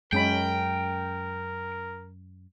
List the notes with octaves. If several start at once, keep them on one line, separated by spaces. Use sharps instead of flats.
F#2 G#3 C#4 A#4 G5 B5